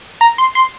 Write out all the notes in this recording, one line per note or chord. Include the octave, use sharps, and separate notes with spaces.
A#5
C6
C6